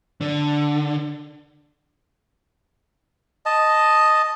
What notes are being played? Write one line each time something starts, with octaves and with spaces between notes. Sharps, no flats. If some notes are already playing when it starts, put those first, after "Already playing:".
D3
D#5 A5